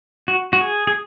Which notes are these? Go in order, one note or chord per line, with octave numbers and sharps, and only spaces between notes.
F#4
F#4
G#4
G#4